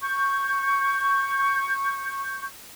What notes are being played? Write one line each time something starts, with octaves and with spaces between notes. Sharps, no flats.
C#6 G6